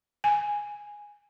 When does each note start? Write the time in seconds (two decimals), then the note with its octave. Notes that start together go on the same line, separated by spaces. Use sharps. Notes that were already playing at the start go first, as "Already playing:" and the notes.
0.24 G#5